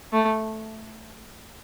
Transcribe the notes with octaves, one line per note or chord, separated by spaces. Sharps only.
A3